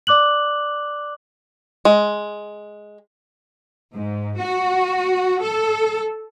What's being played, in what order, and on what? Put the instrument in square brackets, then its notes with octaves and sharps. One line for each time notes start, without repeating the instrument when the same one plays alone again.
[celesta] D5 D6 F#6 F#7
[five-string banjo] G#3
[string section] G#2
F#4
A4